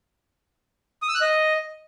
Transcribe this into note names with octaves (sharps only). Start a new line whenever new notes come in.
D#6
E6
F#6
D#5